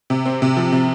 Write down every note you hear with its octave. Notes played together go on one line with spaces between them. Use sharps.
C3
C4
C3
F3
C3